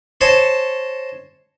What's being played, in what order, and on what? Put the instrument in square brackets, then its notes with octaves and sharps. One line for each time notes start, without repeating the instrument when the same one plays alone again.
[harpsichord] C5 C#5 D#5 G#5 A5